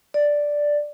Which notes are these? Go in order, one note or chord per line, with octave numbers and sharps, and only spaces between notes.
D5